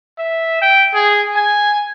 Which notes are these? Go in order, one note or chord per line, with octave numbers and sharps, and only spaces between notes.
E5
G5
G#4
G#5